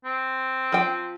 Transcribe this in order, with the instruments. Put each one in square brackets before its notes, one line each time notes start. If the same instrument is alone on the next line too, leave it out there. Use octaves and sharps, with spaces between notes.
[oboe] C4
[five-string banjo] F3 G5